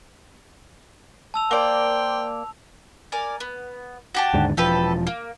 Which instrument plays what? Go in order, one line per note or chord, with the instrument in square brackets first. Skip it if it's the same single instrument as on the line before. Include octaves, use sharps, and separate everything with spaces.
[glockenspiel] A5 E6 F7
[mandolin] A#3 D5 [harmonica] C5 G5
[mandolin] A#4 D5 G#5
B3
F#4 G4 A5
[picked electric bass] D#2 G#2 D3
[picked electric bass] E1 F3 [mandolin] G4 A4 B4
[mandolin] A#3